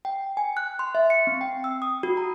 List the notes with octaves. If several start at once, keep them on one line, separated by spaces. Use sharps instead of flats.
G5
G#5
F#6
C6
E5
C#7
C4
G5
E6
D#6
F#4
A#5